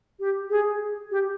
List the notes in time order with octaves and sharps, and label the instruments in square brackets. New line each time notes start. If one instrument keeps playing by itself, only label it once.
[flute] G4
G#4
G4